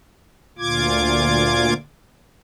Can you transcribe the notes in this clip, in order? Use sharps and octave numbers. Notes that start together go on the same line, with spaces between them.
D2 A#2 F4 D6 G#6